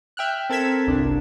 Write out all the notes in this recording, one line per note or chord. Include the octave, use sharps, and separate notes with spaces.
E5 G5 F6 F#6
C4 A4 A#4 G#6 B6 E7
G1 C2 D4